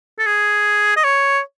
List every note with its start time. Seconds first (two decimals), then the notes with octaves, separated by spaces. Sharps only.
0.19 A4
0.26 G#4
0.97 D#5
1.04 C#5